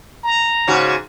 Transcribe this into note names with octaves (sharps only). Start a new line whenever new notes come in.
A#5
G#2 C#3 F#4